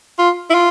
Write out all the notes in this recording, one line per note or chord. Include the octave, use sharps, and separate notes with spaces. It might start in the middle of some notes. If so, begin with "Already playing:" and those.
F4
E4
F4